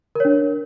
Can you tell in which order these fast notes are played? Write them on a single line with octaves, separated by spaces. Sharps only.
A#4 C#5 D4